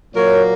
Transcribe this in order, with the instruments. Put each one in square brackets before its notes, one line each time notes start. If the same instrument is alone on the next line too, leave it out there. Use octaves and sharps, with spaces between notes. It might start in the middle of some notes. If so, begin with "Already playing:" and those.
[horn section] A#2 F#3 A#3 A#4 C#5